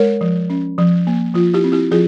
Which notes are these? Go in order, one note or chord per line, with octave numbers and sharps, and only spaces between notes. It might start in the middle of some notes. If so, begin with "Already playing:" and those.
Already playing: G#3 A#4 C#5
F3
C#4
F3
A#3
F3 F4
E4 G4
C4
E4 G4
F3 F4 G#4